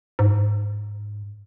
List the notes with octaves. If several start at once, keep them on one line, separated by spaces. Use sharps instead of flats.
G#2